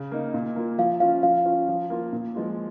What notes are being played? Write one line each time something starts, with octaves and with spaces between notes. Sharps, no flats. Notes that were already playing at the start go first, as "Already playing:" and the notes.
Already playing: C#3
A#3 D#4
A#2
A#3 F4
F3 F5
C#4 F4 F5
F3 F5
C#4 F4
F3
A#3 F4
A#2
F3 G#3 F4